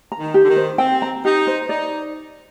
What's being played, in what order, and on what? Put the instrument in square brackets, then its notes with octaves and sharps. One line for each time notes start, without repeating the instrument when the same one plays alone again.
[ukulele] A#5
[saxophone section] D#3
[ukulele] G4
[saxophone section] D3
D#3
[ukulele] C5
[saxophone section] C4 [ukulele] G5
[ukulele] A#5
[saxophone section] D#4 [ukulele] G4
[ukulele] C5
[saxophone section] D#4 [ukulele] D5